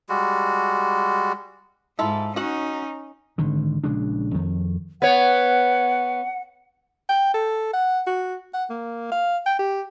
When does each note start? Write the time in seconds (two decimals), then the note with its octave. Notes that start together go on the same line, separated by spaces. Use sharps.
0.09 G3 G#3 F#4
1.99 G#2 E4 F4 A4
2.36 C#4 D#4 F#4 F#5
3.38 G#1 D3 D#3
3.84 A#1 C#3 G#3 D4
4.34 F2 D#3
5.02 B3 C#5 F#5
7.09 G5
7.34 A4
7.73 F#5
8.07 F#4
8.54 F#5
8.70 A#3
9.12 F5
9.46 G5
9.59 G4